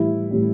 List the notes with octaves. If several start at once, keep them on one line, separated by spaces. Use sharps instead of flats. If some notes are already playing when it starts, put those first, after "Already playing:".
Already playing: A2 E3 G3 E4
A2 E3 G3